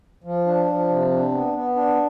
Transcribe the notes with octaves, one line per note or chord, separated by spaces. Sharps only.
F3
D4
F3
C3
D4
B3
B3
D4